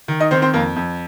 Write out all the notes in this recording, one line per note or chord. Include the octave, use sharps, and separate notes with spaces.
D#3
D#4 D#5
D#3 C4 C5
C4 C5
F2 A#3 A#4
F2